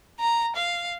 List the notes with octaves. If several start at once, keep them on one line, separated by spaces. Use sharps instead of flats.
A#5
F5